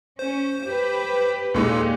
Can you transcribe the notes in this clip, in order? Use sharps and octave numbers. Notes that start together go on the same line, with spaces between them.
C#4 C5
G4 B4
D#2 A#2 G#3 D#4 G4 A4